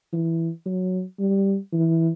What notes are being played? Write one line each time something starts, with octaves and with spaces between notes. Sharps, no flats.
E3
F#3
G3
E3